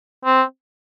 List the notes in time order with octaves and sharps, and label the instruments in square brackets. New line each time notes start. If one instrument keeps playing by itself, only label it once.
[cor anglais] C4